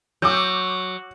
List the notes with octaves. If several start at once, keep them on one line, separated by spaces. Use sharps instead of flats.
F#3 D6 E6 G6